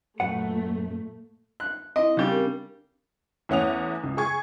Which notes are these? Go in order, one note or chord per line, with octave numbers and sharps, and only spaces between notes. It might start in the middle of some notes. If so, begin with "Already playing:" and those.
F#2 A#2 A3 B4 F#5
F#6
C4 E4 D#5
C#3 G3 C4 G4
D4 A#4
E2 A3 C#4 F#5 D#6 F7
C#2
G#4 C#6 G#6